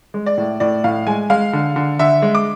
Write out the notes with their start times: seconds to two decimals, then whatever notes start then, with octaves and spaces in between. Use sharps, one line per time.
0.14 G#3
0.26 D5
0.37 A2
0.60 A2 D5
0.84 A2 F5
1.07 G#3 G#5
1.30 G#3 F5
1.53 D3
1.76 D3
1.99 D3 E5
2.22 G#3
2.35 D6